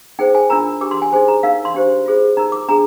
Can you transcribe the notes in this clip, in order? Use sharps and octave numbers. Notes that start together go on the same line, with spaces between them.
D#4 G#4 C5 G5
G#5
D4 F4 A#4 A#5
D4 G4 A#4 D6
C6
G#5
D#4 G#4 C5 G#5
A#5
D#4 A#4 F5
C6
D4 G4 C5
F4 G#4 C5
D#4 A#4 A#5
D6
D4 G#4 A#5